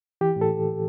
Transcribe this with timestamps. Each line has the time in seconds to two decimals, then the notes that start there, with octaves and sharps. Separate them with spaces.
0.21 E3 G4
0.36 A2
0.41 A4